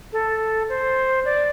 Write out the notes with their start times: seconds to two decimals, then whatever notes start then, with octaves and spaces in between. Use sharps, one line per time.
0.13 A4
0.69 C5
1.25 D5